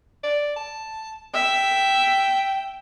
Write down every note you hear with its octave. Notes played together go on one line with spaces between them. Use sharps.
D5
A5
E5 G5